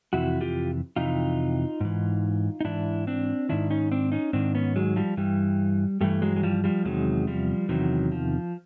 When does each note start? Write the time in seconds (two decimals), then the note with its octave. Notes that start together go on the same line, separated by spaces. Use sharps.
0.13 F2 C3 E3 E4 F#4
0.41 F4 G4
0.96 F2 C3 E3 D#4 F4
1.80 G#2 E3
2.61 D#4
2.64 G#2 E3 D4 E4
3.07 C4 D4
3.49 G#2 D#3 D4 E4
3.70 C#4 D#4
3.91 C4 D4
4.12 C#4 D#4
4.33 G#2 D#3 C4 D4
4.55 B3 C#4
4.76 F#3 G#3
4.96 F3 G3
5.17 G2 E3 G3
6.01 G2 E3 G3 A3
6.22 F#3 G#3
6.36 G#3
6.43 F3 G3
6.64 F3 G3
6.85 E2 C3 D#3 F#3 G#3
7.27 F3 G3
7.69 E2 C3 D#3 E3 F#3
8.12 F3